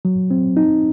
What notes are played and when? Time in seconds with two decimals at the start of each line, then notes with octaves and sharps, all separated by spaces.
0.05 F#3
0.31 C4
0.57 D#4